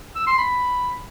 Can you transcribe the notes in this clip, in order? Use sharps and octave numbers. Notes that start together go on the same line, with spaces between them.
E6
C6
B5